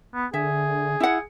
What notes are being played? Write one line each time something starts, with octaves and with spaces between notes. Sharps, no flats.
B3
D3 G#4 E5
E4 F#5